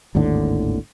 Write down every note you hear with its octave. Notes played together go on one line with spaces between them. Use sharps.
G#1 D#2 A2 D3